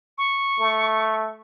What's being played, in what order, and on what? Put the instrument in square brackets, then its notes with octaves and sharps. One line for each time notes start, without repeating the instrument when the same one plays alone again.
[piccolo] C#6
[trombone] A3